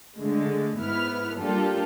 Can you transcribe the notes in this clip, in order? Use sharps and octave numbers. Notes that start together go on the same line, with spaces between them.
D3 G#3 A3
G#2 B3 E4 B4 F6
G3 A#3 D4 F4 G4 A4